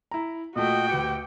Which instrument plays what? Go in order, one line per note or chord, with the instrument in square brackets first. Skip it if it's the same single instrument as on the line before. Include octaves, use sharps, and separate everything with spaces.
[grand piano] E4 A#5
[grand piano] A#2 A3 [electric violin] F#4 G5 [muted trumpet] D#5
[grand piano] D2 B4 C#7 [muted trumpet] G4